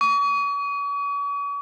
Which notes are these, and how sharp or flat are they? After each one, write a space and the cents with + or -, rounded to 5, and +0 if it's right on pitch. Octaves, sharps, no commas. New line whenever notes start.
C#6 +45